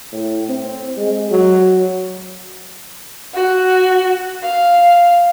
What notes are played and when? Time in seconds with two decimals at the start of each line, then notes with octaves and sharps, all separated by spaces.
0.12 A2
0.49 C4
0.97 G#3
1.31 F#3
3.34 F#4
4.43 F5